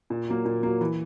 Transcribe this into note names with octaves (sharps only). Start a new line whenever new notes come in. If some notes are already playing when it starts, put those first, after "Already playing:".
A#2
F#3 A#3
A#2
F#3 A#3
E3